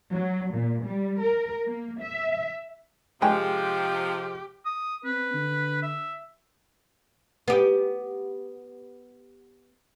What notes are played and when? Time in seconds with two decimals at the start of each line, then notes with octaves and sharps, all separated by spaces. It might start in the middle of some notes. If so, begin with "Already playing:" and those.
0.12 F#3
0.54 A#2
0.84 G3
1.22 A#4
1.66 A#3
2.01 E5
3.22 C3 D#3 F3 G#3 G4 G#4 G5
4.65 D#6
5.05 C4 B4
5.34 D3
5.83 E5
7.48 B3 G4